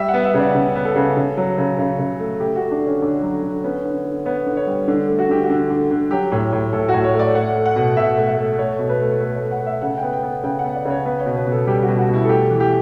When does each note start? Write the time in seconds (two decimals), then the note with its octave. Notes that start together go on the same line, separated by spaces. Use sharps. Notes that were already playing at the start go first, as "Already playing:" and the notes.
Already playing: G3 E5
0.08 F#5
0.14 B3
0.24 E5
0.34 C#3 D5
0.55 C#3
0.76 B3
0.85 A4
0.96 C#3
1.17 C#3
1.37 F#3
1.58 C#3
1.79 C#3
1.99 C#3
2.20 A3
2.40 A3 G4
2.56 F#4
2.61 A3
2.71 D4
2.82 D3
2.87 C#4
3.02 D3 D4
3.22 F#3
3.43 D3
3.64 B3 C#4
3.85 D3
4.05 D3
4.26 B3 C#5
4.46 D3
4.57 C#5
4.67 G3
4.88 D3 D4
5.08 A3
5.19 F#4
5.29 D3 G4
5.44 F#4
5.49 D3
5.70 D3
5.91 D3
6.11 F#3 G4
6.32 A2
6.52 A2
6.73 A2 A4
6.88 F#4
6.94 A2
7.04 C#5
7.14 A3
7.19 D5
7.35 A3 F#5
7.56 A3
7.66 F#5
7.76 B2
7.96 B2 E5
8.17 A3
8.27 E5
8.37 A3
8.58 A3 C#5
8.79 B2
8.89 B4
9.00 A3
9.20 A3 B4
9.36 C#5
9.41 A3
9.51 F#5
9.61 A3
9.66 E5
9.82 C#3 F#5
9.97 G5
10.03 B3
10.13 G5
10.23 B3
10.43 C#3 G5
10.59 F#5
10.64 B3
10.75 D5
10.85 C#3 C#5
11.05 B3 B4
11.20 C#5
11.26 B2
11.37 B4
11.47 B2 A4
11.67 G3 G4
11.83 F#4
11.88 B2
11.98 F#4
12.08 B2
12.14 E4
12.25 A4
12.29 A3 G4
12.50 E3
12.60 G4